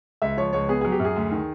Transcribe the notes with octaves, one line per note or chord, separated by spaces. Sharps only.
C#2 E5
F3 C#5
C#2 C#5
B3 G#4
F#3 G#4
G4
F#2 G#4
D2
D#3